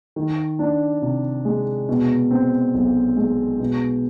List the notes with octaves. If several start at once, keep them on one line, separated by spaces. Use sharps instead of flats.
D#3
D4
C3
G#3
B2
C4
B1
G#3
B2